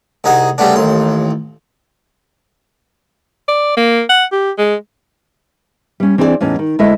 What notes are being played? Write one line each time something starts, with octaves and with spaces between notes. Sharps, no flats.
C2 D#4 G#4 F#5
C#3 G3 A3 B3 D4
A1 D#2 C6
D5
A#3
F#5
G4
G#3
G3 C#4
E3 C4 D4 G#4 A#4 D5
E2 A2 C#4 D#4
D#3
D2 G#3 E4 A4 D#5 E5